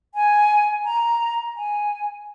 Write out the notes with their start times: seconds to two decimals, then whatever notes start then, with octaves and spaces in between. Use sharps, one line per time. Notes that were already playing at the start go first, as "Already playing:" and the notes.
0.15 G#5
0.85 A#5
1.56 G#5